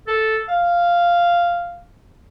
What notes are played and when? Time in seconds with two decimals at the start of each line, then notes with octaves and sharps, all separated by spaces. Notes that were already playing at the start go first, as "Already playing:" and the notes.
0.07 A4
0.48 F5